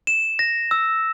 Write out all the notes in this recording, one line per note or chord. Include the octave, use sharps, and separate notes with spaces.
E7
A#6
E6